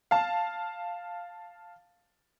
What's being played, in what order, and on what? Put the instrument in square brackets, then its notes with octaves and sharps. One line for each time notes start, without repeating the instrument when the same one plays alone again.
[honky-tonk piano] F5 A5